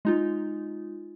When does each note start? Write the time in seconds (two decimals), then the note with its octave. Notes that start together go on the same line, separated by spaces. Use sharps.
0.05 G#3 D#4 F4